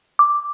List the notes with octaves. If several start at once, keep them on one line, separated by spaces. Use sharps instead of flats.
D6